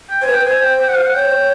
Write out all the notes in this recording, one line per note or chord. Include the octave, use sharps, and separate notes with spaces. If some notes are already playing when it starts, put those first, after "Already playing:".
G5
C5 G#5
B4
G5
B4
C5 G#5
G5
G5
F#5
F5
F#5
C#5 G5
C5
C#5